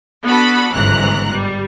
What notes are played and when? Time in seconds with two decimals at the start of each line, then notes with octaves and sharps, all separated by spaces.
0.24 B3 D4 F#4 A4 B5
0.73 G1 C#2 G#2 E3 A#5 F#6
1.32 G3